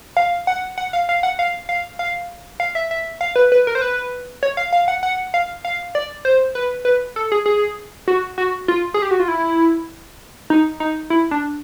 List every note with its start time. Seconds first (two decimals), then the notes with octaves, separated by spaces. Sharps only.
0.17 F5
0.47 F#5
0.78 F#5
0.93 F5
1.09 F5
1.23 F#5
1.39 F5
1.69 F5
1.99 F5
2.60 F5
2.75 E5
2.91 E5
3.21 F5
3.36 B4
3.52 B4
3.67 A#4
3.75 C5
3.82 B4
4.43 C#5
4.57 F5
4.73 F5
4.88 F#5
5.03 F#5
5.34 F5
5.65 F5
5.95 D5
6.25 C5
6.55 B4
6.85 B4
7.16 A4
7.32 G#4
7.46 G#4
8.08 F#4
8.38 F#4
8.68 F4
8.94 G#4
9.02 G4
9.11 F#4
9.20 F4
9.28 E4
10.50 D#4
10.80 D#4
11.10 E4
11.31 D4